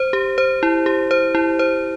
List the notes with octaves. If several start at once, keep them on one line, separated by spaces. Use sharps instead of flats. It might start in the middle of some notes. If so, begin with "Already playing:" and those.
Already playing: C5
G4
C5
E4
G4
C5
E4
C5